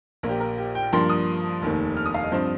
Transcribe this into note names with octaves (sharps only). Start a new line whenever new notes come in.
A#1 A#2 A#3
G4
A#4
G4
G5
G2 F3 A#3 C6
D#6
F1 D#2 D#3
F6
D#6
F5
D#5
G2 F3 C4 C5